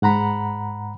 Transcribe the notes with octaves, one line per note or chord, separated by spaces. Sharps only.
G#2 F#5 A#5 B5